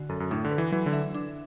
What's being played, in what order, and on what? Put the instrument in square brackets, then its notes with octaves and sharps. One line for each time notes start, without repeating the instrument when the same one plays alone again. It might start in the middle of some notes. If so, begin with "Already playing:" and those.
Already playing: [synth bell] D3 F#4
[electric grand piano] F#2 [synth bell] A4
[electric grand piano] F#2
[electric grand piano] A2 [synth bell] D4
[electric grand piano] D3
[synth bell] B4
[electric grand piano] E3
[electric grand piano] E3 [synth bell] F#3
[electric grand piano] D3
[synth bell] E5
D4